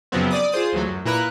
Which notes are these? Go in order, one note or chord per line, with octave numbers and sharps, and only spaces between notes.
F#2 C#3 F3 F#3 B3 C4
D5 D6 D#6
F4 G#4 C5 D#6
D2 E3 F#3 A3
F#2
A#2 E4 A#4 B4 F#6